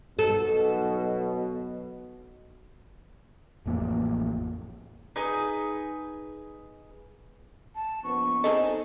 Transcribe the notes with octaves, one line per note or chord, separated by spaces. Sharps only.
B1 B2 A4
A1 F2 A#3
D#4 G#4 B4 G#5
A5
A#1 B3 C#6
C4 D#4 G#4 A4 D#5